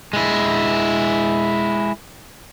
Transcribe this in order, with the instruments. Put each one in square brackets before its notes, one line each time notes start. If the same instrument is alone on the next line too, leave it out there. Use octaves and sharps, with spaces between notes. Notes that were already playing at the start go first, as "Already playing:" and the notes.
[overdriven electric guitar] G#3 E4